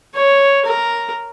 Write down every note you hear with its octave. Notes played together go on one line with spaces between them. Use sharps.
C#5
A#4